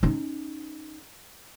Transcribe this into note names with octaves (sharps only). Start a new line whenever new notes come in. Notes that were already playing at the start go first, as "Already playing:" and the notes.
C#4 D#4